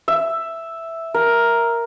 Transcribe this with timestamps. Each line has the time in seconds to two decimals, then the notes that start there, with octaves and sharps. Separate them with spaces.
0.08 E5
1.14 A#4